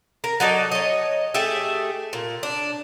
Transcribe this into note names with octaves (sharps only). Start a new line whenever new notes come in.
A#4
F#3 D#4 A4 D5
C#5 D#5
A3 G4 G#4 E5
A#2
D4